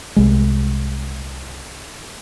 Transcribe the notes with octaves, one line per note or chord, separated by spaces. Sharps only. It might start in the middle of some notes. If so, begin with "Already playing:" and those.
C2 G#3